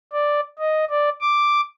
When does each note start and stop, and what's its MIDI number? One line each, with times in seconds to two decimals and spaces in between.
0.13 0.40 74
0.58 0.85 75
0.90 1.09 74
1.21 1.61 86